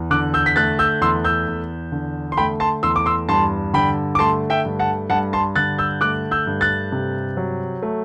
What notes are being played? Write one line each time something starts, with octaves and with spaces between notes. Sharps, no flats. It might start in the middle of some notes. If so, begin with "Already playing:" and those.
Already playing: E2
D3 D6 F#6
E6 G6
B6
A3 F#6 A6
E6 G6
E2 C6 E6
E6 G6
E2
D3
C6
A3 G5 B5
A5 C6
E2 C6 E6
D6
C6 E6
G2 A5 C6
D3 G5 B5
D6
A3 A5 C6
E5 G5
G2
F#5 A5
G2 F#5 A5
A5 C6
D3 F#6 A6
E6 G6
A3 D6 F#6
E6 G6
G2
F#6 A6
C3
F#3
A3